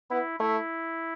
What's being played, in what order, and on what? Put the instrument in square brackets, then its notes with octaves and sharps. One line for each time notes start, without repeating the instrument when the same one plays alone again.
[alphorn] B3 [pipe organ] E4
[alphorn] A3 [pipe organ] E4